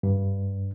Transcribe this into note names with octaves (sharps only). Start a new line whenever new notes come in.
G2